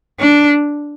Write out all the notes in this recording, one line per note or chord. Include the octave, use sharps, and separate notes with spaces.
D4